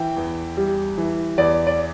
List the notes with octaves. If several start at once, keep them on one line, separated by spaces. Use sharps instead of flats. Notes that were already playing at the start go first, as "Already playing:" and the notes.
Already playing: E3 G5
E2
G3
E3
E2 D5
D5